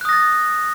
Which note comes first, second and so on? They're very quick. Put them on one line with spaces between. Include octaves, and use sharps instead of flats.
F#6 D#6 A#6 A6